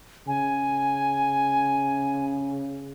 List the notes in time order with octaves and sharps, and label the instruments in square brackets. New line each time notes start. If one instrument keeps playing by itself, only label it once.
[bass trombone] C#3 [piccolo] G#5